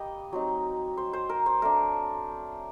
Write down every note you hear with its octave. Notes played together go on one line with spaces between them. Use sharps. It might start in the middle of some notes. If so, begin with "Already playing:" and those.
Already playing: G3 A#3 D#5 G5
F#3 C4 D#4
C5
C5
A#4
C5
A3 D4 A#4